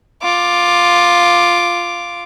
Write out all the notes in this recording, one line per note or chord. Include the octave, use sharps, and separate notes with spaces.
F4 D6